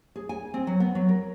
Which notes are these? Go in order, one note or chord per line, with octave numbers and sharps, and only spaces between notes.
G#4
G#5
C4
F#3
B3
F#3
A#4